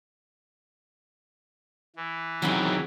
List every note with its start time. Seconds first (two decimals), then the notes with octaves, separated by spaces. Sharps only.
1.96 E3
2.42 E2 C3 D#3 F#3 B5